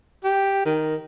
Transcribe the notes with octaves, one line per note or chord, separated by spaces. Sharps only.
G4
D#3